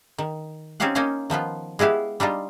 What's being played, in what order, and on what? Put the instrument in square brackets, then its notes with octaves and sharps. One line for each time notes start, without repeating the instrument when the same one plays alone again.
[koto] D#3
C4 C#4 D#4 G4 F5 F#5
A#3 C#4 D#4 C5 F5
D#3 F3 B3 F4
G#3 B3 E4 G4 F5
G3 D4 D#4 F4